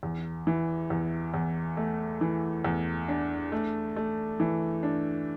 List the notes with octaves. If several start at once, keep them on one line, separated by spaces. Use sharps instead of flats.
E2
E3
E2
E2
A3
E3
E2
D4
A3
A3
E3
D4